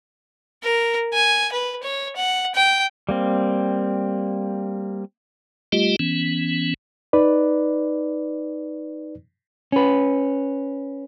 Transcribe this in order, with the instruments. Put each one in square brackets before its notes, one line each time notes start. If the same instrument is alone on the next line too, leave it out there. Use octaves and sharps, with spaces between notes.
[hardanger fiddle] A#4
G#5
B4
C#5
F#5
G5
[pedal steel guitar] G3 A#3 C4
[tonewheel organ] G3 A3 F4 G4 D#5
E3 B3 C#4
[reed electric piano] D#4 B4 D5
[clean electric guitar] C#4 B4